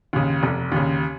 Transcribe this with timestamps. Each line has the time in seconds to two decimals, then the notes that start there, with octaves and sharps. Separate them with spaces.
0.13 D#2 C#3
0.43 F1
0.72 D#2 C#3